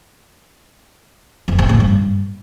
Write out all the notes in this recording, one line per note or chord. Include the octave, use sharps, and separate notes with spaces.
F2
C3
A#2
G2